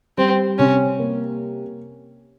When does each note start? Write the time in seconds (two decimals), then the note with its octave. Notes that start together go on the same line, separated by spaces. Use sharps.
0.18 G3 C4
0.58 C3 C#4
0.99 A#3